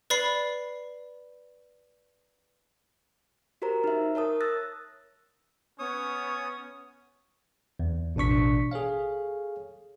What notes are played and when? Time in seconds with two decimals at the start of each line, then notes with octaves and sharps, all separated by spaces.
0.10 B4 D5 B5 C7
3.62 F#4 G4 A#4 C5 A#5
3.84 D#4 E5
4.15 A#4 C#5 A5 D#6
4.41 D#6 E6 F#6 A6 A#6
5.79 B3 C#4 C#5 D#6
7.79 E2
8.16 A1 B2 D4 C#6 B6
8.71 G#4 A4 C#5 F5